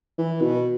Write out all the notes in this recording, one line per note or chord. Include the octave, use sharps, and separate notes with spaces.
E3
B2